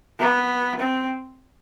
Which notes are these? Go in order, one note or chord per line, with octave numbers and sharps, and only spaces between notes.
B3
C4